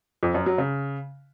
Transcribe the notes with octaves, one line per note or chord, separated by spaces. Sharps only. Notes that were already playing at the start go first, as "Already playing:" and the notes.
F2
F#2
F#3
C#3